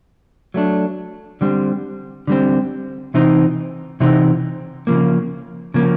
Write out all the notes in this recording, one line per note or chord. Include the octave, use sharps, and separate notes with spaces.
F#3 A3 D4
D3 G3 C4
D3 G3 C4
C3 E3 C4 D#4
C3 E3 C4 D#4
C#3 F3 A#3
C#3 F3 A#3